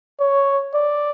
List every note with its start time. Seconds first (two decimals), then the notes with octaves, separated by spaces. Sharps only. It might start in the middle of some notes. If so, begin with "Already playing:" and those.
0.20 C#5
0.74 D5